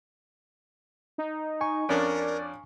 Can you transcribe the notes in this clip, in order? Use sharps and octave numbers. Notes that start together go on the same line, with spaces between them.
D#4
G#5 C#6
F2 C#4 D4 A#4 D5